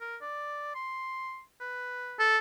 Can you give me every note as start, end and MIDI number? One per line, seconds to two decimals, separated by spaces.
0.01 0.16 70
0.21 0.70 74
0.75 1.42 84
1.61 2.28 71
2.19 2.39 69